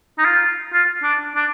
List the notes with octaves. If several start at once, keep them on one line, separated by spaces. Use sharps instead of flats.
D#4
F4
F4
D4
D4